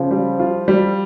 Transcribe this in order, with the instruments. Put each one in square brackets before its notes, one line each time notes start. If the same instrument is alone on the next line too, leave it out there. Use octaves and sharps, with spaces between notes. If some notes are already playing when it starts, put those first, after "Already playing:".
Already playing: [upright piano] C#3 [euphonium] F3
[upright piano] G3
F4
G3